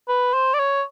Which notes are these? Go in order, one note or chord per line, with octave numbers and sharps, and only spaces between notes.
B4
C5
D5
C#5